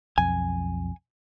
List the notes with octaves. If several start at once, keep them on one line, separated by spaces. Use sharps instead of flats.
B1 F2 G#5